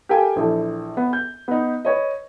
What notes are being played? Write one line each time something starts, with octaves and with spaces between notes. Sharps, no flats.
G4 A4 A#4 F5 G5 G#5
A#1 E3 A4
B3
G6
B3 D#4
B4 C#5 D#5